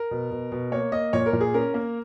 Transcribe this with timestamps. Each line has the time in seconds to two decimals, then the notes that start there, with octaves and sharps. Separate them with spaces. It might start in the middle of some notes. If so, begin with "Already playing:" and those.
Already playing: A#4
0.11 B2
0.31 B2
0.52 B2
0.72 A#3 C#5
0.92 A#3 D#5
1.13 A#2 C#5
1.26 A#4
1.33 A#2
1.41 G#4
1.54 C#4 A#4
1.74 A#3